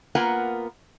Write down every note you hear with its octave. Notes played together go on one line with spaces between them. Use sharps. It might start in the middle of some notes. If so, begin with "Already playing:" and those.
A#3 B3 F4 A#4 F#5 G#5